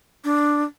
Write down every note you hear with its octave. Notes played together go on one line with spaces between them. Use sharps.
D4